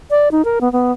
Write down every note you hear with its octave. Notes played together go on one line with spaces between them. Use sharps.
D5
D#4
A#4
B3
B3